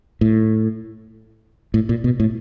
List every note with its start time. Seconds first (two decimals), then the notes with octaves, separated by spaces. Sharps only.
0.21 A2
1.74 A2
1.89 A#2
2.04 B2
2.20 A2